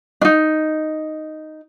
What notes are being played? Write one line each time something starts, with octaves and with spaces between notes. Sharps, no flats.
D4 D#4